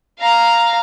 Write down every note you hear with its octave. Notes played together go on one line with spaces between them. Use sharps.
F5 A#5